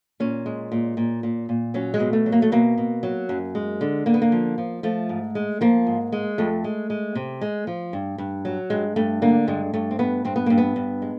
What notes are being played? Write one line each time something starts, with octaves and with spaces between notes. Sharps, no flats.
A#2 C#4
G#3
A#2
A#2
A#2
A#2
F#3 C#4
G#3
B2
A3
F#3
A#3
A3
B2 A#3
B2
F#3
F#2
G#3
D3
D3 A#3
B3
A#3
F3
F3
F3 A3
G#2
G#3
F3 A#3
G#2
G#3
F2 A3
G#3
G#3
C3
G#3
F3
G2
G2
F#3
G2 G#3
G2 A3
D3 A#3
G2 G#3
G2 A3
C4
G2 B3
G2 C4
B3
G2 A#3
B3
G2
G#3